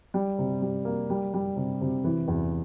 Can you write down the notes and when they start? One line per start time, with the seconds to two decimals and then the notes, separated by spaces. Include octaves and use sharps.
0.14 G3
0.39 C3
0.62 G3
0.85 A#3
1.10 G3
1.34 G3
1.56 C3
1.81 C3
2.04 E3
2.28 E2